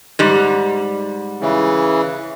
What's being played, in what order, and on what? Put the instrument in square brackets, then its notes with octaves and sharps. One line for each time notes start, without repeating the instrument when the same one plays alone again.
[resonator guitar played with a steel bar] G#2 G3
[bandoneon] C#3 E3